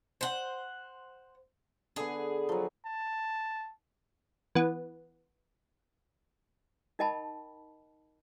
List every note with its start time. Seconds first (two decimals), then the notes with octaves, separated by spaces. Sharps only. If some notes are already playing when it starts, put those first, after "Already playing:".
0.21 C5 F#5
1.96 D3 B3 G#4
2.49 F3 F#3
2.85 A5
4.55 E3 B3
6.99 D#4 A#4 D#5 G5 A5 B5